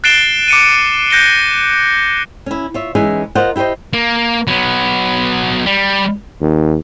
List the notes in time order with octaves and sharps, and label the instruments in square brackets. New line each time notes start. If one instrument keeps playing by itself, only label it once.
[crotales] F#6 A6 C7 D7 E7 G7
D6 C#7 D#7
F#6 G6 A#6 C#7 G7
[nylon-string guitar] C#4 E4
F4 C#5 E5
E3 G#3 C#4 D#4 G#4 E5
F4 A#4 C5 D#5 F#5
E4 G4 A#4 C5 D#5
[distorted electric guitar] A#3
F#3 B3
G3
[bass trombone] D#2